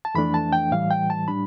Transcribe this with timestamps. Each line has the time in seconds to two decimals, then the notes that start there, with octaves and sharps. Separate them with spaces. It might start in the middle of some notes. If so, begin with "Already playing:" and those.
0.05 A5
0.15 F2 E3 A3 D4 B5
0.34 A5
0.53 G5
0.71 A2 E3 G3 F5
0.90 G5
1.10 A5
1.28 A2 G3 D4 B5